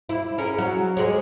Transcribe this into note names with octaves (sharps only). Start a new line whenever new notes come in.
E4
C#4 G#4 A#4
F#3
G#3 G#4 C#5